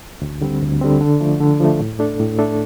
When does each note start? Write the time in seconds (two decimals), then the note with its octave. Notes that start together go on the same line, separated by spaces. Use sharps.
0.22 D2
0.41 D3 G3 C4
0.62 D2
0.81 D3 G3 C4
1.01 D3
1.20 F3 A3
1.40 D3
1.60 F3 A3
1.80 A2
1.99 A3 D4 A4
2.19 A2
2.39 A3 D4 A4